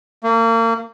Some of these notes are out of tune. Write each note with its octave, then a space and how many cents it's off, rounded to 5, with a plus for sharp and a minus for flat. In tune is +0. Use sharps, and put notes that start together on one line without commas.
A#3 -35